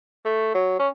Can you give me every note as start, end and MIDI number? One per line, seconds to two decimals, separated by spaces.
0.25 0.53 57
0.54 0.74 54
0.79 0.88 61